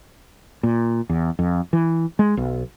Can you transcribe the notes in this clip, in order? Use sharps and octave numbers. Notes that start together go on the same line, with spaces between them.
A#2
E2
F2
E3
G#3
B1